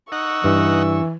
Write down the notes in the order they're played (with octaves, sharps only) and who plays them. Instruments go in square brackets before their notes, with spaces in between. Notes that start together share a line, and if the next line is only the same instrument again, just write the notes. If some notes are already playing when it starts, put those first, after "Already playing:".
[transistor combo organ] D#4 F#5 [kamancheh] C#6 E6
[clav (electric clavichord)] G2 [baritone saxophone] E3